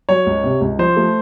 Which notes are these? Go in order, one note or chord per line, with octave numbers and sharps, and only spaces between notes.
F#3 C#5
C#2
C3
C#2
F3 C5
A3